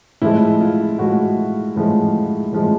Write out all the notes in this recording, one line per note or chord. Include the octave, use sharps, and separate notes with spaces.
A2 F3 G#3 E4
F4
A2 F3 G#3 F#4
A2 F3 G#3
A2 F3 G#3